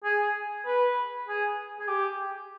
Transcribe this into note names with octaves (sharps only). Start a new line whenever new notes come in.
G#4
B4
G#4
G#4
G4